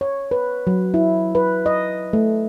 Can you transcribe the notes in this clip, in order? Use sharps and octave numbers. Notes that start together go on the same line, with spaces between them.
C#5
B4
F#3
E4
B4
D#5
A3